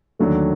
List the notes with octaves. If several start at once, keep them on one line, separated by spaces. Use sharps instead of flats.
D#2 D3 F#3 A3